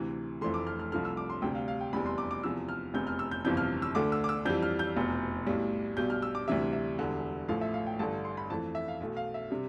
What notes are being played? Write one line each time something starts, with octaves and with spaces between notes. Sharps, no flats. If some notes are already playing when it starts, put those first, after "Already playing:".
Already playing: D2 C3 E3
F1 F2 E3 A3 C6
D6
F6
F6
C2 C3 F3 A3 F6
E6
D6
C6
D2 C3 G3 G5
F5
F5
G5
F1 E2 C3 G3 B5
C6
D6
D6
E2 C3 F3 E6
F6
F1 E2 C3 G6
F6
E6
G6
G1 F2 C3 E3 G6
F6
E6
D2 D3 A3 D6
E6
D6
E6
F2 E3 G3 G6
F6
G6
F1 E2 B2
B1 A2 G3
B1 B2 G3 G6
F6
E6
D6
D2 C3 E3 G3 E5
E5
E1 E2 D3 G3
A1 A2 F3 A3 F5
E5
F5
G5
A1 G2 D3 A3 A5
C6
B5
F2 E3 A3 A5
E5
F5
B1 B2 A3
F5
E5
C3 G3